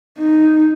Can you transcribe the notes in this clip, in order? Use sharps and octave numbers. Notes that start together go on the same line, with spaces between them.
D#4